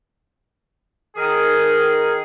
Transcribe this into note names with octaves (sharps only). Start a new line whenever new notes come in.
D#3 G#4 A#4